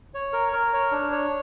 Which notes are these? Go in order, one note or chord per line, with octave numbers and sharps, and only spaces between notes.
C#5
A#4
A#4
C#5
D4
C#5